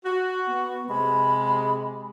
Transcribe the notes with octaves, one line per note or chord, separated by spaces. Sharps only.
F#4
B3
C3 G#3 B5